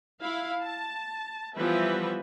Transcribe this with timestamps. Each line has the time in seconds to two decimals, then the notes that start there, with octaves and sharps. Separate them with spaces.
0.22 E4 F5
0.61 A5
1.55 E3 F3 G3 B3 B4 E5